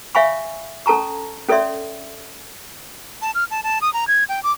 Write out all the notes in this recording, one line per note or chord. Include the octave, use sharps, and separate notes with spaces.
C#5 E5 F5 G#5 B5 C#6
C#4 A4 A5 A#5 C#6
C#4 A4 C#5 D5 E5 C6
A5
F6
A5
A5
D#6
A#5
G#6
G5
D6